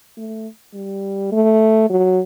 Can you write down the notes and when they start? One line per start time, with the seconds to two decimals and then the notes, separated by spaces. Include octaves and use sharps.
0.17 A3
0.74 G3
1.32 A3
1.90 F#3